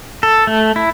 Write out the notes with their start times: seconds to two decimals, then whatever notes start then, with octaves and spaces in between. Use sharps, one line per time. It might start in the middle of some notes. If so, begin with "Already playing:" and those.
0.23 A4
0.47 A3
0.76 E4